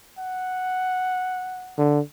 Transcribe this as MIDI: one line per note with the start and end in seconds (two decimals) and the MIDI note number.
0.19 1.84 78
1.78 2.00 50